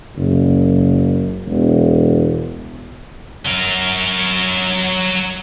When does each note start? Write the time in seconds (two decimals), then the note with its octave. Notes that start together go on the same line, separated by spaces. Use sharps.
0.16 F#1
1.46 E1
3.45 F#3 A#4